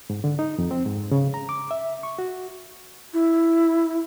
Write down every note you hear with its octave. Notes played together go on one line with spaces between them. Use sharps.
G#2
D3
D#4
F2
C4
G#2
C#3
A#5
D6
E5
C#6
F#4
E4